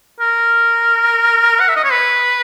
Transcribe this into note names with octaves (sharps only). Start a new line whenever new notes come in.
A#4
F#5
E5
D#5
C#5
B4